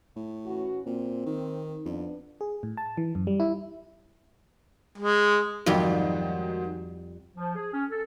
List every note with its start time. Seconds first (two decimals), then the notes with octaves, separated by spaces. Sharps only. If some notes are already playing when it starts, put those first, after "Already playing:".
0.16 A2
0.46 E3 C#4 F#4
0.87 A#2 C4
1.26 D#3
1.85 F2 B3 D4
2.41 G#4
2.63 A2
2.77 A5
2.97 E3
3.15 F#2
3.27 G3
3.40 E4
4.98 G#3
5.66 F2 G#2 D#3 F#3 G3 G4
7.36 F3
7.56 G#4
7.73 C#4
7.90 A4